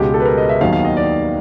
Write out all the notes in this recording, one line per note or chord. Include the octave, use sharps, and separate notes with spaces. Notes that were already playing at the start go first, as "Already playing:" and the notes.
Already playing: C#2 B2 G#3 G4
A4
B4
A#4
D#5
E5
D#2 D#3 F#3 B3 F5
F5
D#5
D5